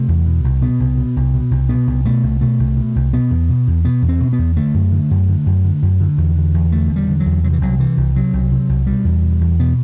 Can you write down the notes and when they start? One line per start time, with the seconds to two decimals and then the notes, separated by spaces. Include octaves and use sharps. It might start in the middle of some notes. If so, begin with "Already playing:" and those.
Already playing: C3 A3
0.08 E2
0.26 B2
0.44 C2
0.62 B2 B3
0.80 C2
0.97 B2
1.16 C2
1.34 B2
1.51 C2
1.69 B2 B3
1.87 C2
2.05 B2 A3
2.23 C2
2.41 B2 A3
2.59 C2
2.77 B2
2.96 C2
3.13 B2 B3
3.30 E2
3.49 B2
3.67 E2
3.85 B2 B3
4.02 E2
4.09 C4
4.20 B2
4.33 B3
4.38 E2
4.57 D3 A3
4.74 F#2
4.92 D3
5.11 F#2
5.29 D3
5.46 F#2
5.64 D3
5.82 F#2
6.00 D3
6.18 E2
6.36 D3
6.54 E2
6.72 D3 A3
6.89 E2
6.96 G3
7.08 D3
7.20 F#3
7.26 E2
7.44 C3 F#3
7.53 E3
7.61 C2 F#3
7.79 C3 E3
7.97 C2
8.16 C3 F#3
8.33 C2
8.52 C3
8.69 C2
8.87 B2 G3
9.04 E2
9.23 B2
9.41 E2
9.59 B2 B3